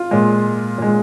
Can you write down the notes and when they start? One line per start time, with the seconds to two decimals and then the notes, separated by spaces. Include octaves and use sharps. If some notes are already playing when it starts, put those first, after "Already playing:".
Already playing: F4
0.11 A#2 G#3
0.78 A#2 G#3